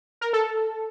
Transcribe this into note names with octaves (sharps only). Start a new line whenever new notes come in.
A#4
A4